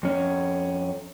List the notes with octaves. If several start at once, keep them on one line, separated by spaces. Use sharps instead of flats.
F2 C#4